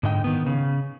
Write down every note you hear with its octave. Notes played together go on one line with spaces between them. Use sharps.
G#2 D3 D#5 G5
D#3 B3
C#3